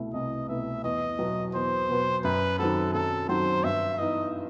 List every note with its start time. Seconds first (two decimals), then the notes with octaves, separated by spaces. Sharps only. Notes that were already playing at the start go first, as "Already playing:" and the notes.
Already playing: C2 B2 A3 E4
0.14 C2 D#5
0.48 B2 A3 E4 E5
0.84 E2 D#5
1.19 B2 F#3 B3
1.54 E2 C5
1.89 B2 F#3 B3
2.24 F#2 B4
2.59 D#3 F#3 C4 F#4 A4
2.94 F#2 A4
3.29 D#3 F#3 C4 F#4 C5
3.64 G2 E5
3.99 E3 B3 D#4 D#5